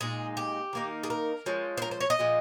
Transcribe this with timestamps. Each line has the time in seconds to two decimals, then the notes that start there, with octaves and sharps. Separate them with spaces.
0.01 A#2 G#3 D#4 G#4
0.37 G4
0.73 D#3 A#3 D#4
1.03 G#4
1.10 A#4
1.46 F3 G#3 C#4
1.77 C5
1.82 A#4
1.91 C5
2.01 C#5
2.10 D#5
2.19 A#2 F3 G#3